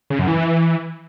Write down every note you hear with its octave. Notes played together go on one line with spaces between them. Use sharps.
C#3
F#2
E3